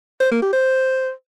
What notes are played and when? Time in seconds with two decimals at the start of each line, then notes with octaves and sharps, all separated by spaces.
0.21 C5
0.31 A#3
0.42 G4
0.53 C5